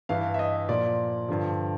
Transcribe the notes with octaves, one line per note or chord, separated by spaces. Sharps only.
G2 E3 F5
E5
D#5
A#2 F3 D5
G2 D3 F3